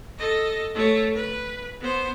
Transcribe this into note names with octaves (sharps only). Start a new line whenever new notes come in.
A4 D#5
A3 C#5
B4
B3 C5